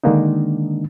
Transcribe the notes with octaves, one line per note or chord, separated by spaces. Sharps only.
D3 D#3 G#3 A#3 D4 D#4